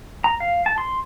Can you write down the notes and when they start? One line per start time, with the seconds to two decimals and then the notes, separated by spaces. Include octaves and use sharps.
0.24 A#5
0.40 F5
0.66 A5
0.78 C6